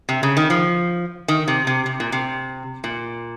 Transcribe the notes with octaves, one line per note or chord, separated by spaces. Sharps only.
C3
C#3
D#3
F3
D#3
C3
C3
C3
A#2
C3
A#2